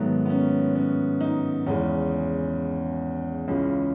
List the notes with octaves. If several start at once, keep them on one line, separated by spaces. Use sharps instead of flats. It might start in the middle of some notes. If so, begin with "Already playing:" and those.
Already playing: G#2 D#3 F#3 A3 B3
B3
C#4
C#4
D#4
E2 C#3 E3 G#3 C#4
C#2 C#3 E3 G#3 C#4